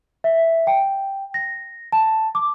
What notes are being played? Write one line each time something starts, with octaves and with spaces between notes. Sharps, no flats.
E5
G5
A#6
A5
D6